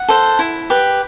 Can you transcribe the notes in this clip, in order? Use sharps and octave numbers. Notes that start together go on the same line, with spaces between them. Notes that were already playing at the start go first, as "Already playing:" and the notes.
Already playing: F#5
A4 C5
E4
G4 B4